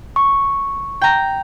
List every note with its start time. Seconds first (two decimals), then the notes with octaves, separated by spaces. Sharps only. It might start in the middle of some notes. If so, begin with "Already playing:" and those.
0.16 C#6
1.01 G5 A#5